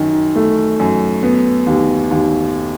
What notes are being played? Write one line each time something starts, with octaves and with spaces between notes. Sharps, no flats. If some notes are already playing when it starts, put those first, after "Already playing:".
Already playing: F#2 D#3
A3
F#2
B3
D#2
D#2